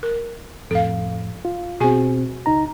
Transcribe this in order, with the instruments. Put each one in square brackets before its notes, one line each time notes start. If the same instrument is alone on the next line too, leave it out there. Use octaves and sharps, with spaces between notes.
[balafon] A#4
[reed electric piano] F2 A2 [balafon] A4 F5
[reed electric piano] F4
[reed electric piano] B2 C4 [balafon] F#4 G#4 G#5
[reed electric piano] C#2 D#4 A#5